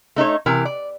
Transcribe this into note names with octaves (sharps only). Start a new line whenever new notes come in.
A3 D#4 B4 C#5
C3 E3 G4 A#4
D5